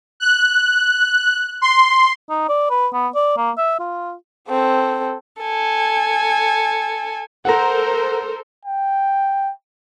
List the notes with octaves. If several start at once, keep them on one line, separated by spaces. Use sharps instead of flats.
F#6
C6
D#4
D5
B4
B3
D5
A#3
E5
F4
C4 A4
A4 G#5
A4 A#4 C5 F#5 A#5
G5